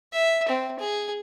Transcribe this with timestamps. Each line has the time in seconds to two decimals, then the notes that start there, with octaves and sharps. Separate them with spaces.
0.13 E5
0.49 C4
0.80 G#4